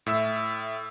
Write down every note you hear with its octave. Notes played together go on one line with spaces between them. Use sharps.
A2 E5 E6